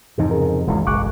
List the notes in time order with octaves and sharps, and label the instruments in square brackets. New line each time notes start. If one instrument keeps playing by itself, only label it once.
[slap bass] F2 G#2 C3 [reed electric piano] E3 D#4
[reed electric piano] C#3 G#4 A#4
[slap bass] D#1 C#2 F#2 [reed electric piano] E3 G#3
[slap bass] F#1 B1 G#3 [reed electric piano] C#6 D6 F#6